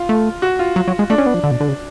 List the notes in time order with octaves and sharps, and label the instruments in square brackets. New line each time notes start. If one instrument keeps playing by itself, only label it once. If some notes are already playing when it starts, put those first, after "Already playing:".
Already playing: [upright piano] F4
[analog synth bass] A3
[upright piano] F#4
F4
[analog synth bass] F#3
F#3
G#3
[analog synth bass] A3 [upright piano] D4
[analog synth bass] C#4
B3
F3
D3
B2
D3
C#3